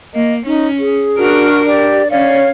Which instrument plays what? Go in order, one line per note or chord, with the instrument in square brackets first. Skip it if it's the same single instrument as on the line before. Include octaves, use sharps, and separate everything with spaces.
[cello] A#3 [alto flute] D#5
[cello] C#4 [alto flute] D#4
[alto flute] G#4
[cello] D4 A#4 [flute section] F#4 F6
[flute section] G4 [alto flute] D5
[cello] C#4 [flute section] C#5 F5 [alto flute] D5